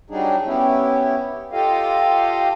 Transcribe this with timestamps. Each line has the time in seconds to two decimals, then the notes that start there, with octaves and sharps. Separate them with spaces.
0.10 F#3 G3 D4 D#4 G#4
0.45 B3 C#4 E4 G4
1.53 F4 G4 A4 D#5 F5